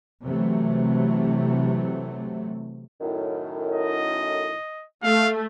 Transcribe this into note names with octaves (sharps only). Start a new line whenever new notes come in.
C3 E3 F#3 A3
F#2 A2 D#3
D#5
A3 F5